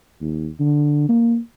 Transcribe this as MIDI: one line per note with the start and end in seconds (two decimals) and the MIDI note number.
0.21 0.49 39
0.60 1.06 50
1.09 1.38 58